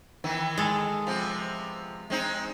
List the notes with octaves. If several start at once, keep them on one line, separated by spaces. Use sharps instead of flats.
D#3 E3 B3
G#3 A4
C3 F3 B3
G#3 C4 D#4